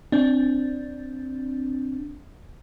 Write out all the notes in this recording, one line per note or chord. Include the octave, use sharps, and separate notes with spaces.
C4 D4